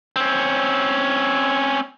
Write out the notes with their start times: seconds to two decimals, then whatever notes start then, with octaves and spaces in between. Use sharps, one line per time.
0.16 C4 C#4